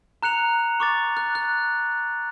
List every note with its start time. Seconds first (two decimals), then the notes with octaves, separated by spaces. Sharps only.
0.23 A#5 F#6 C#7 F7
0.80 C#6 D6 A6
1.17 F#6
1.35 F#6